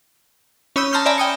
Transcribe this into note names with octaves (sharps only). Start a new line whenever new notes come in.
C#4 C#5 B5 D#6 E6 G6
A5 A#5 C6 F6 G6
D5 E5 G#5 A#5 B5
G5 D#6 C#7